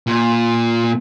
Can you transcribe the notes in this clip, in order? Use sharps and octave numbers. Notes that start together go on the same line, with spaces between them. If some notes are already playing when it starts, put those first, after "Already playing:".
A#2